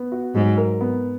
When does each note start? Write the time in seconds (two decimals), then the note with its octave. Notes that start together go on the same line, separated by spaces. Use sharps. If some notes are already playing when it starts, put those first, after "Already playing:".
Already playing: B3
0.12 F#4
0.35 G#2 F#3
0.58 A#4
0.81 B3